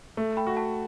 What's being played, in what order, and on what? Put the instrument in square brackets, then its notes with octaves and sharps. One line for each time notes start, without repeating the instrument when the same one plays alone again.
[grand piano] A3
[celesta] G5 B5
[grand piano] F#4
[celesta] F#5 A5